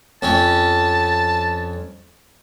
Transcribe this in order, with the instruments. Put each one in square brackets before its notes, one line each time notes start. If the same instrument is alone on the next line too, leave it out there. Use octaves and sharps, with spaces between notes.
[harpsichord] F2 C4 C#4 [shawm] A5